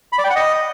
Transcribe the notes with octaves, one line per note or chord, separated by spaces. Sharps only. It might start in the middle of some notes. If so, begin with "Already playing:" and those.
B5
D5
G5
F#5
D#5